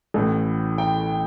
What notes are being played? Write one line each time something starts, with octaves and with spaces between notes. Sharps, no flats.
A1 A2 E3
G5